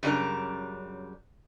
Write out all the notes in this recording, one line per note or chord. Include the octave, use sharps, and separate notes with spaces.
F#2 C#3 G3 D4 A#4